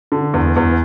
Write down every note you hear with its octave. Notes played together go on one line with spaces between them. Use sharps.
D3
E2
E2